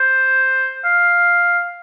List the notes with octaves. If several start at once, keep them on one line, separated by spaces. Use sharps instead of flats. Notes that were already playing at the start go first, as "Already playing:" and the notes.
Already playing: C5
F5